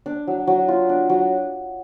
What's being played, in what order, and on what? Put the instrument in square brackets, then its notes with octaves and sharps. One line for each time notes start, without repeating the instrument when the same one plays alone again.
[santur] D4
F#3
F#3
F4
D4
F#3